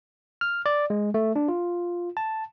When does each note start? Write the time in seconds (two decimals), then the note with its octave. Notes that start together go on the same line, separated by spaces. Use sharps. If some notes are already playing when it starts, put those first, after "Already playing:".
0.41 F6
0.66 D5
0.90 G#3
1.14 A3
1.36 D4
1.48 F4
2.17 A5